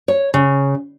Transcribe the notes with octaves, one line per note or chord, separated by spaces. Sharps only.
C#5
C#3